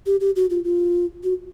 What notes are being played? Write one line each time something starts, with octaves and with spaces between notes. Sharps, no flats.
G4
G4
F#4
F4
F4
F#4